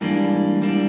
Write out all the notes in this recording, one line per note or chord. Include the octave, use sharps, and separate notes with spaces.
G#2 E3 G3 A#3 D4
G#2 E3 G3 A#3 D4